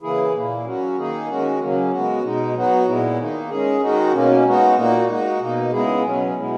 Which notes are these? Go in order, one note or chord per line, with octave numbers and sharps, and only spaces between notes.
C#3 E3 A#3 E4 G#4
A#2 A#3 E4
F#3 C#4 F#4
D#3 A#3 D#4 G#4
D#3 G#3 C#4 F#4
C#3 F#3 A#3 C#4
G#3 B3 F#4
B2 G#3 D#4
F#3 B3 D#4 F#4
A#2 G#3 B3 E4
D#3 A#3 D#4
G#3 C#4 G#4
D#3 G#3 D#4 F#4
B2 A#3 C#4
G#3 B3 D#4 F#4
A#2 A#3 D#4 F#4
G#3 D#4 F#4
B2 A#3 D#4
C#3 G#3 B3 E4 G#4
B2 F#3 C#4
B2 G#3 B3 E4